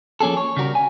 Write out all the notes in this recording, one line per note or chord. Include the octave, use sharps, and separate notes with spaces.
F3 A#3 C#4 G#4 A4
C#5
C#3 G3 F#4 A#4
G#5